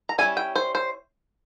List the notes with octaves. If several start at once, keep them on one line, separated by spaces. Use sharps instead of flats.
A#5
G3 C#4 E4 G#5
G5
C5
C5